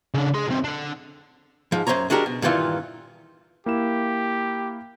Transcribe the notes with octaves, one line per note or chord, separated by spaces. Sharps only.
C#3 D4
G#4 C6
B1 C4
D3 D4
G#2 F3
F#2 C3 C5 C#5 A#5
G#3 D4 F#4 G4 A#4
B2
G2 A#2 D#3 E3 F4
A#3 E4 G4 E7